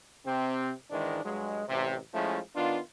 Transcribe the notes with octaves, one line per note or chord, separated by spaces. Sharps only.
C3 C4
G#2 D#3 E3 G#3 D4
G2 F#3 G#3
A1 C3
F3 G#3 A3 C#4 E4
D#3 B3 D4 F4